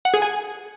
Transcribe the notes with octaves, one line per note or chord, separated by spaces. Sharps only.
F#5
G#4
G#5